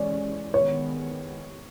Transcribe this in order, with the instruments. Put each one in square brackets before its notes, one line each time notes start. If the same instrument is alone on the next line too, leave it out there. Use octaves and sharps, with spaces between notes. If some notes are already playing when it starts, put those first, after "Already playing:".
Already playing: [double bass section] E3 G#3 C#4 [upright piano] D5
[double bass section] D#3 G#3 B3 [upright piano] C#5